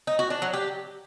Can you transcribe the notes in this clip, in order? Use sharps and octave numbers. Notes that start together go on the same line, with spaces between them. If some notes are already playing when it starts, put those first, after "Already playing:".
D#4
F#4
D4
F#3
G4